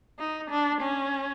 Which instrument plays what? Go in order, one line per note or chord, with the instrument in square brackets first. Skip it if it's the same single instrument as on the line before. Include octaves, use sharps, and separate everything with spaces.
[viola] D#4
D4
C#4